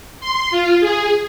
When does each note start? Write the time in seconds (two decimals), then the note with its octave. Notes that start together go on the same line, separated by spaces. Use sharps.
0.21 C6
0.51 F4
0.80 G#4